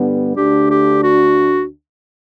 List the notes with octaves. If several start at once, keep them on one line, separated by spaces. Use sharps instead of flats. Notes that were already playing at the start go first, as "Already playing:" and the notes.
Already playing: G2 D3 G3 B3
D2 D3 A3 D4 G4
G4
F#4